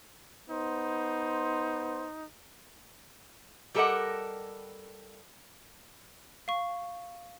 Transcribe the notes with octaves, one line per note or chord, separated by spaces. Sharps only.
B3 D#4 C5
G3 G4 A4 A#4 D#5 F#5
F5 C#6